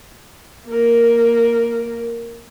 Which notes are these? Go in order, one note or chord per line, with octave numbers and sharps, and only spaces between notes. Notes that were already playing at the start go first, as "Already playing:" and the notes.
A#3 A#4